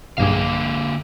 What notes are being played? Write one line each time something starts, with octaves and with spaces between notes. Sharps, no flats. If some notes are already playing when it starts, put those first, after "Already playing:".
B1 G2 D3 A#3 G#4 F5